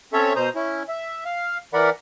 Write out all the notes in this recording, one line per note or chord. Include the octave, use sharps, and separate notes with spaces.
C4 C#4 A4 C#5 E5
B2 C5 A#5 D#6
C#4 E4
E5
F5
E3 A#4 D5 F#5 B5